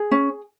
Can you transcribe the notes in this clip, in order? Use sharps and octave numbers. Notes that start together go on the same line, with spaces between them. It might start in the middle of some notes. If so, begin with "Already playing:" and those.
Already playing: G#4
C#4